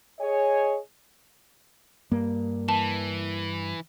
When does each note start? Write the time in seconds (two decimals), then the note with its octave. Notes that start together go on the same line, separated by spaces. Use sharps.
0.19 G#4 C#5 D#5 G#5
2.12 G2 A#3
2.69 E3 A5